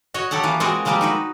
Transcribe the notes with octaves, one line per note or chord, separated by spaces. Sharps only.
F#4 C#5 D#5
F#3 G4 A4 F#5
E3 A#3 B3
G#3 C4 F4 F#4 A#4 D#5
F3 G3 G#3 A#3 C4 G4
D#4 F#4 B4